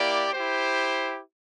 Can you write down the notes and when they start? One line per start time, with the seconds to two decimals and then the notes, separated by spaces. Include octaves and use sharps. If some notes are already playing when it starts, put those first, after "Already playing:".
Already playing: A#3 E4 G4 D5
0.32 E4 G4 C5